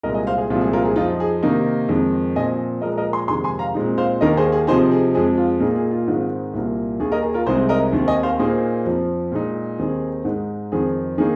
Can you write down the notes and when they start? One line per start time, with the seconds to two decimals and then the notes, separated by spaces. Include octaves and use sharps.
0.03 C2 A#2 G#3 A#4 D#5
0.15 D#5 G#5
0.27 C5 F5
0.38 G#4
0.50 C2 A#2 F3 G#3 C4 F4
0.61 G#4
0.73 F4 A#4
0.85 G#4
0.96 F2 F3 C4 D#4 F4
1.20 G#4
1.43 C3 D#3 A#3 D#4
1.89 F2 D#3 G#3 C4
2.36 A#2 F3 C4 D#5 G#5
2.82 A#2 F3 G#3 A#4 D#5
2.98 A#4 D#5
3.13 G#5 C6
3.28 F2 C3 D#3 G#3 G#5 C6
3.44 G#5 C6
3.59 F5 A#5
3.75 A#2 G#3 C4 D#4
3.98 C5 F5
4.21 D#2 D#3 A#3 D#4 A#4 D#5
4.37 G#4 C5
4.52 G#4
4.67 C3 F3 C4 D#4 G#4 C5
4.92 G#4
5.14 F2 F3 G#3 C4 G#4
5.37 F4
5.60 A#2 A#3 D#4 G#4
5.76 G#4
5.91 F4
6.08 G#2 D#3 G#3 C4
6.53 C2 A#2 A#3
7.00 D#2 D#3 A#3 G#4
7.12 A#4 D#5
7.23 G#4
7.34 F4 A#4
7.46 C2 C3 G#3 C4 D#4 G#4 C5
7.69 A#4 D#5
7.93 D#2 D#3 C4
8.08 D#5 G#5
8.23 C5 F5
8.39 A#2 A#3 D#4 G#4 C5
8.85 F2 F3 C4
9.32 A#2 G#3 D#4
9.79 D#2 D#3 C4 D#4 G#4
10.25 G#2 G#3 D#4
10.72 F2 D#3 C4 G#4
11.18 D#3 A#3 D#4 G#4